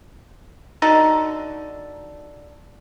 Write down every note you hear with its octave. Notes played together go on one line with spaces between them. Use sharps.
D3 D#4 F#4 A4